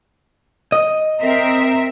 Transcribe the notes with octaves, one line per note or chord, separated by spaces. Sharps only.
D#5
C4 A#4 E5